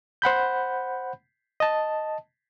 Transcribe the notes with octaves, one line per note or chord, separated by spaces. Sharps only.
C5 F#5 B5 G6
D#5 A5